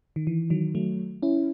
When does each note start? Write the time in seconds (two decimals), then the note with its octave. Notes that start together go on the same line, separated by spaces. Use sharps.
0.16 D#3
0.27 E3
0.50 D#3 F#3
0.75 F#3 A3
1.22 C#4 E4